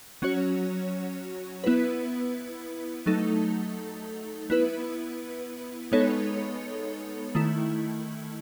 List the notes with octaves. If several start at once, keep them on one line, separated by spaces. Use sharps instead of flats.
F#3 C#4 F#4 C#5
B3 E4 B4
F#3 A3 D#4 A4
B3 E4 B4
G#3 B3 D#4 A4 C#5
D#3 A3 E4